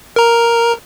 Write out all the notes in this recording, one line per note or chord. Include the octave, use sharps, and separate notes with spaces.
A#4 A#5